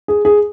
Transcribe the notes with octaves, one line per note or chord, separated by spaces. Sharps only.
G#4
G#4